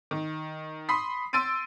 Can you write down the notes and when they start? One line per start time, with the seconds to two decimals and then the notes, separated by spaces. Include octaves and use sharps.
0.11 D#3
0.89 B5 C6 D#6 B6 C7
1.33 C6 E6 A6 D7 D#7